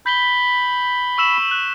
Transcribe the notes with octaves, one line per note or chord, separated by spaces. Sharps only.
B5 G6 B6 G7
C#6 E6 E7
F#6